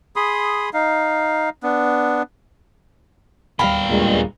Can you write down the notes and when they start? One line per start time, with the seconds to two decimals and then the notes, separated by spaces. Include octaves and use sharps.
0.16 G#4 B5 C6 D#6
0.73 D#4 F5
1.63 B3 D4
3.59 D1 D#2 G3 B3 F5 G5 A#5 B5
3.90 G2 A#2 G#3